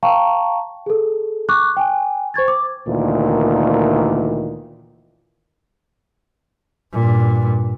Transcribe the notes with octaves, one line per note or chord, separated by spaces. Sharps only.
F5 G5 A5 A#5 C#6
G#4 A4
C#6 D6 F#6
G5 G#5
C5 C#6 G#6 A6
D6
D2 A#2 D#3 E3
G2 A#2